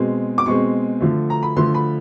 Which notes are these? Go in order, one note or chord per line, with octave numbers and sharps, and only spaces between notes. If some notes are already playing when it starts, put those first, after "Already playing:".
Already playing: B2 G#3 C4
D6
B2 G#3 C4 C#6
D3 F3 A3
A#5
B5
D3 F3 A3 C6
B5